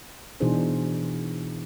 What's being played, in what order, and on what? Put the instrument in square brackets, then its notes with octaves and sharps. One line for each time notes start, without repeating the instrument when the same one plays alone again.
[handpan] B2 E3 D4 D#4 G#4 C5